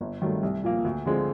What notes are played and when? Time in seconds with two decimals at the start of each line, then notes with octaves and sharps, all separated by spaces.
0.01 G1
0.22 G2 D#3 F#3 A3
0.43 C2
0.64 A#2 F3 A#3
0.85 D2
1.06 D3 F3 G#3 C4